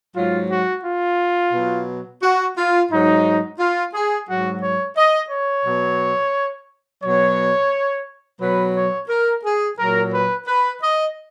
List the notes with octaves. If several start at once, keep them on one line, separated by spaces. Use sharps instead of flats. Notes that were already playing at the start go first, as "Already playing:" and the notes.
G#2 F#3 F4
F#4
F4
B2 F#3
F#4
F4
G#2 F#3 D#4
F4
G#4
G#2 F#3 F#4
C#5
D#5
C#5
B2 F#3
B2 F#3 C#5
B2 F#3 B4
C#5
A#4
G#4
A#2 F#3 A#4
B4
B4
D#5